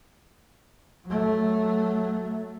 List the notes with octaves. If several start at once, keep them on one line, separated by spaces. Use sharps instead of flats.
F#3 A3